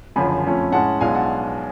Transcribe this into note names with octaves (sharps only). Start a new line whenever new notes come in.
F#1 F#2 D3 F3 G#5 B5
F2 F3 A3 C#4
A2 G#3 C#4 F#5 A5
B1 B2 G#3 D4 F4 F5 G#5
F#5 A5